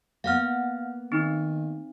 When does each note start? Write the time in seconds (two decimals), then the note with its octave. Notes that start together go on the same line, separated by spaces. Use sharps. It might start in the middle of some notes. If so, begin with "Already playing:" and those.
0.24 A#3 B3 F5 F#5 F6
1.12 D#3 C4 D#4